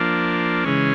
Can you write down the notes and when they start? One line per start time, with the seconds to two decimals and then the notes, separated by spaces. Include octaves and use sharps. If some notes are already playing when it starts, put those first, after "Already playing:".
Already playing: F3 A#3 D4
0.64 C#3 E3 G#3 C#4